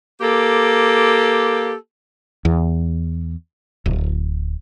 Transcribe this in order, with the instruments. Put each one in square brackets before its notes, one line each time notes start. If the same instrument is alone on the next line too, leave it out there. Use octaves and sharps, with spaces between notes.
[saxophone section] A#3 G4 A4
[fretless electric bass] E2
D1